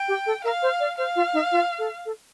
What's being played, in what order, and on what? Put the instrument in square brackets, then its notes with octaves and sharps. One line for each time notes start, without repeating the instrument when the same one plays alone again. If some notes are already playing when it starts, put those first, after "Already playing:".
Already playing: [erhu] G5
[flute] G4
A4
[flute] A#4 [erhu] F5
[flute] C5
D5
[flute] C5 [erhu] F5
[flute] F4
D#4
F4
A4
A4